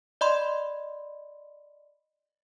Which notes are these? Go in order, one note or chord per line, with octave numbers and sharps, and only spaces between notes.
D5 D#5 B5 C6